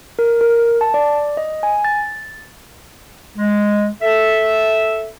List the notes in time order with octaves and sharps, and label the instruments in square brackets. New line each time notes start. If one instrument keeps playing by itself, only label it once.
[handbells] A#4
A#4
A5
D5
D#5
G#5
A6
[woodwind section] G#3
A4 E5